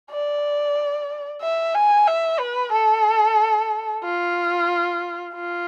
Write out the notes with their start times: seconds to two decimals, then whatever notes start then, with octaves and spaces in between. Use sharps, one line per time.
0.11 D5
1.42 E5
1.74 G#5
2.07 E5
2.39 B4
2.72 A4
4.04 F4
5.35 F4